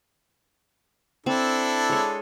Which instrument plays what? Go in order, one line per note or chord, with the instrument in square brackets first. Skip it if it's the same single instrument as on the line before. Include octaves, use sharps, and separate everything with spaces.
[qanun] C4 [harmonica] D4 E4 A4
[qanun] G#3 C#5